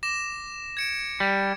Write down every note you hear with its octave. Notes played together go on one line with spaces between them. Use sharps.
D6 A#6 E7
G#6 C#7 D7
G3